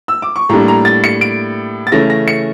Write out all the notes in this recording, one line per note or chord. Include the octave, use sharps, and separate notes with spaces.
E6
D6
C#6
A2 G3 A#3 D4 A#5
A#5
A6
C#7
D7
A6
C#3 E3 A3 C#4 A#6
A#6
C#7